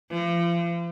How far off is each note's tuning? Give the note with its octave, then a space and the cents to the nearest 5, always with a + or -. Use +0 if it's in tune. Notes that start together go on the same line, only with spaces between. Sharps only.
F3 -40